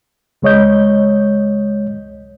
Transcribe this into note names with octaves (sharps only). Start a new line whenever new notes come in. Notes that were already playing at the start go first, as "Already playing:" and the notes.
C#2 G#3 C#5 D#5 G6